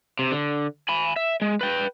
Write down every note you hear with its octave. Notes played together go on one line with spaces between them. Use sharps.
C3
D3
G#5 B5
E5
G#3
B4 G5